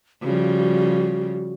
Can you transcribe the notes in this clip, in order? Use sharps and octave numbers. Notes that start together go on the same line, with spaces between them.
C#3 F3 G3 F#4